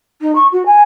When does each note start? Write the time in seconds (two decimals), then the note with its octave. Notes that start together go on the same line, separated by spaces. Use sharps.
0.21 D#4
0.35 C#6
0.52 F#4
0.65 G#5